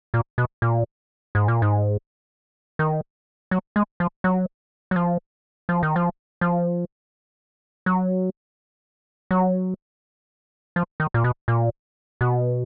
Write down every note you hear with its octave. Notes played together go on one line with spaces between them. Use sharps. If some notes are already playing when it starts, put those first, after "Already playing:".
A#2
B2
A#2
G#2
A#2
G#2
D#3
F#3
G#3
F3
F#3
F#3
F3
F3
D#3
F3
F3
F#3
F#3
F3
D#3
A#2
B2
A#2
B2